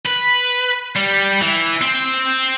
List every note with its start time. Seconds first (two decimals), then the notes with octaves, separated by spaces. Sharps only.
0.06 B4
0.96 G3
1.42 E3
1.82 C4